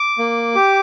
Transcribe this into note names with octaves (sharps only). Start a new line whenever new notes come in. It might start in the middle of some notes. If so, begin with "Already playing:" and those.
Already playing: D6
A#3
G4